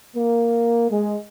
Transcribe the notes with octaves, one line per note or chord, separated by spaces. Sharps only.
A#3
G#3